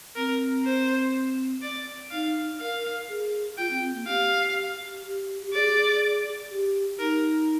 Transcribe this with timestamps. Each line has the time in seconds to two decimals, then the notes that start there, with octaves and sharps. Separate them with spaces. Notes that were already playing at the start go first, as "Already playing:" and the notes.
0.16 C4 A#4
0.65 C5
1.62 D5
2.11 D#4 F5
2.59 A#4 F5
3.09 G#4
3.58 F4 G5
3.70 C4
3.82 C4
3.94 A#3
4.06 G4 F5
5.04 G4
5.42 G4
5.53 G#4 D5
6.51 G4
6.99 D#4 A#4